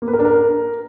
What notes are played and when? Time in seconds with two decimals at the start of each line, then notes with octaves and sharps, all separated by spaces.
0.02 A#3
0.08 B4
0.13 A#4
0.19 D4
0.25 A#4